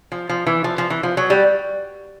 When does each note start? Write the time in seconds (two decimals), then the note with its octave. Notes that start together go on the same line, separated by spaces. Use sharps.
0.12 F3
0.29 F3
0.47 E3
0.64 F3
0.78 F3
0.90 E3
1.03 F3
1.17 F#3
1.30 G3